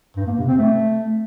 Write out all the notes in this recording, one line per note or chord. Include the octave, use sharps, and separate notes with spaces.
G2
A#3
C3
C4
A3